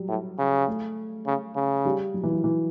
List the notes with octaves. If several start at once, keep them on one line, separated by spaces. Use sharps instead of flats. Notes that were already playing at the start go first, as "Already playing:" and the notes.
Already playing: F#3 G3
A2
C#3
A3
C#3
C#3
G3
F#3
E3
F#3
E3